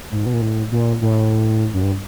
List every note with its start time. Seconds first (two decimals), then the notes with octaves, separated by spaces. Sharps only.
0.11 G#2
0.26 B2
0.33 A#2
0.42 A2
0.72 A#2
1.01 A2
1.74 F#2
1.83 G2